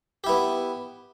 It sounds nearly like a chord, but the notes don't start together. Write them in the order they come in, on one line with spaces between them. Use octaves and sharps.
G4 E4 B3